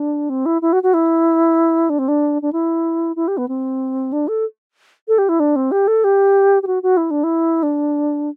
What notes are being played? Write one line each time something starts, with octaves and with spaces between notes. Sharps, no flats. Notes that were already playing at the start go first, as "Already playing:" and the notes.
Already playing: D4
C4
E4
E4
F#4
F#4
E4
D4
C4
D4
D4
E4
E4
G4
B3
C4
D4
A4
A4
G4
E4
D4
C4
G4
A4
G4
G4
F#4
F#4
E4
D4
E4
D4